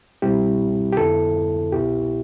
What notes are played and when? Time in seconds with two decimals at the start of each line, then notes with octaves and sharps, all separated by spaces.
0.22 C2 B2 G3 C4 E4 G4
0.92 G4
0.97 F2 D3 F3 B3 E4 A4
1.72 C2 B2 B3 E4 G4